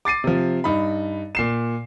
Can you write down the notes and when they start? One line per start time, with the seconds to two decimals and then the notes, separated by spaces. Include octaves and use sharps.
0.05 D6 A6 C7 D#7
0.24 C3 F3
0.64 G2 D#4 B5
1.35 A#2 C7 E7